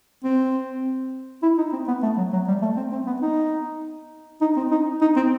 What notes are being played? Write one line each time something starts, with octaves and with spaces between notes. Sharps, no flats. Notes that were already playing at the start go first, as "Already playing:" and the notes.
C4
E4
D#4
C4
B3
A3
F#3
F#3
G3
A3
C4
C4
B3
D#4
D#4
C4
D#4
D#4
C4